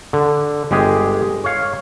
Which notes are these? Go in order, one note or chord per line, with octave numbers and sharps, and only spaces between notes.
D3
G1 G#3 G4 G#4
C#5 F5